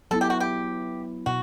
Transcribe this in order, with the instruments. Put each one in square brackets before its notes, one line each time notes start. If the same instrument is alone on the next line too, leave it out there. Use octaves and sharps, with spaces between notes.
[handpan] F#3 B3 E4 [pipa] A4
[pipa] G4
F#4
G4
[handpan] B2 [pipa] F#4